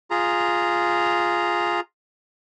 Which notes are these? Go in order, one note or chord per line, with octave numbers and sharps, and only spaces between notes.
F4 G#4 A#5